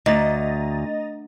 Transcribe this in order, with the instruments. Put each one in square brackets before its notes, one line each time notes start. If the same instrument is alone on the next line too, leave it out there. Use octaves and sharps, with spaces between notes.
[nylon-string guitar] D2 [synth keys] D#5 A#5 A6